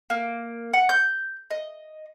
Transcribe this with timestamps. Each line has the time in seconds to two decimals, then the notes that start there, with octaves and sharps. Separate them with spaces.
0.10 A#3
0.73 F#5
0.89 G6
1.51 D#5